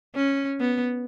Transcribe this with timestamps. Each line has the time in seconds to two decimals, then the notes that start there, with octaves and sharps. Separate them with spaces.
0.15 C#4
0.60 B3